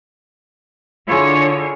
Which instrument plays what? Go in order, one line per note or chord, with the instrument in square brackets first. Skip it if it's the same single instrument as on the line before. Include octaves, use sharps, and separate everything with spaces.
[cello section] D3 C#5 [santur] E4 F4 G#4